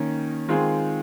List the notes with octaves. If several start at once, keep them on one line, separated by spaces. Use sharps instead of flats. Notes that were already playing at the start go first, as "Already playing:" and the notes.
Already playing: D#3 A#3 C#4
D#3 G#3 C4 F4 G#4